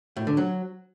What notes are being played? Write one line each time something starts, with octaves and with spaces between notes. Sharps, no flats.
A2
D3
F#3